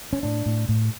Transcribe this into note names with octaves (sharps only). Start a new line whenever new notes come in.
C#4
A2 D4
A2
A2